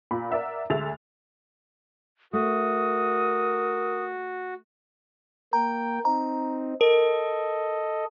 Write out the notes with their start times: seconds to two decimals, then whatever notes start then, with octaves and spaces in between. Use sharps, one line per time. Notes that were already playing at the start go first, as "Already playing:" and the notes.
0.11 A#2 B5
0.30 A#4 D5 E5 F#5
0.70 D2 G#3 A3 E5 A6 F7
2.33 A3 F#4 A#4 D#6
5.53 A#3 G5 A#5
6.05 C4 D#4 A#5
6.81 A4 A#4 D#5